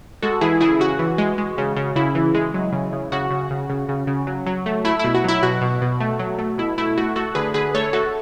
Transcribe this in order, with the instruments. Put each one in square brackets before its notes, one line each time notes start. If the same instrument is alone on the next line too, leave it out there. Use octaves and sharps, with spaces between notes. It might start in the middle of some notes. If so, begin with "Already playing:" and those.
[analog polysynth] G#3 F#4 A4
E3 E4 G#4
C#3 E4 G#4
C#3 F#4
E3
G#3
G#3
C#3
C#3
C#3 E4
E3
G#3
F#3
C#3
C#3
C#3 F#4
C#3
C#3
C#3
C#3
C#3
F#3
F#3
A3
A3 E4
B2 E4
F#4
F#3 E4
B2 F#4
B2
B2
A3
F#3
A3
B2 E4
A3 E4
A3 F#4
A3 F#4 A4
D3 G#4 B4
D3 G#4 B4
A3 A4 C#5
A3 F#4 A4